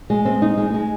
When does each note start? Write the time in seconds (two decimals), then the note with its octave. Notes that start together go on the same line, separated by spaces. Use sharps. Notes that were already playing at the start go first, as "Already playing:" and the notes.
0.10 G#3
0.25 C4
0.42 D#4
0.57 G#3
0.74 G#3